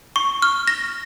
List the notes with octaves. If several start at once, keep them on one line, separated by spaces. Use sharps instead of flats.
C#6
F6
A#6